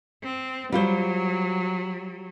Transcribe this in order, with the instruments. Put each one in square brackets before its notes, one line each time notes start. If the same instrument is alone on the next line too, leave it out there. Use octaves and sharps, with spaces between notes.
[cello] C4
[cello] F#3 [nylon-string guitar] G3 F4 C5